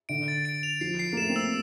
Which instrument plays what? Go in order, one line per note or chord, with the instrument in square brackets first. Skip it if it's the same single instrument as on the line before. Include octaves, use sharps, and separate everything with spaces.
[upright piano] D3 [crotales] D7
[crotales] A6
D7
F7
[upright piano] F3 [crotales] C7
[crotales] C7
[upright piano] A#3
[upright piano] A3 [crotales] E7
[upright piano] C4
[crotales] E6